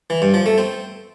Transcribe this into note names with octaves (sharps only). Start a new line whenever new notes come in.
E3
G2
F3
A3
C4